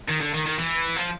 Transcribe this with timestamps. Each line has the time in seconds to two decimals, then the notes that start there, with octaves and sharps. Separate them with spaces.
0.09 D#3
0.21 D3
0.35 D#3
0.46 D#3
0.59 E3
0.96 F3